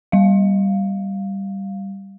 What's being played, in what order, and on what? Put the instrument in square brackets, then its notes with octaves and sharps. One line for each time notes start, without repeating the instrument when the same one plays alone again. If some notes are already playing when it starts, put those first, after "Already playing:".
[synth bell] G3 F5